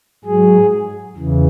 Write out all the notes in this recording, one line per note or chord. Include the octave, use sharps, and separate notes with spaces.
G#2 F#3 G#4
E2 C#3 E3